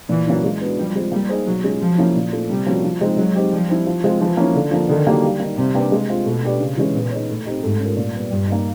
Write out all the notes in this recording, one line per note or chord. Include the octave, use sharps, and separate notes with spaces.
A#2 E3
F#3 A#3 C#4 E4
G#3
B3 D4 F#4
F3 G3
G#3 C4 F4
G3 A#3
D#4 G#4 C5
B2 F#3
G#3 C#4 F4 G#4
F3 F#3
A#3 C#4 E4
A#2
F3 A3
C3 G3
F3 A#3 C#4 F#4
F3
G#3 C4 D#4
F#3 G#3
C4 D#4 G4
F3 G3
C4 E4
F3
G#3 C4 F4
E3 F3
A#3 C#4 E4
D3
F3 A#3
D3 D#3
F#3 A#3 D#4 G4
G3
A#3 D#4
C3 G3
A#3 D4 G4 B4
G#3
C4 F4
B2 A3
D4 G4 B4 D5
C#3
E3 G#3 C#4
A#2 B3
D#4 G#4 C#5
A2 A3
C4 D#4 G4
G#2 A3
C#4 F4 A#4
A#2
G3 B3
G2 G3
A#3 D#4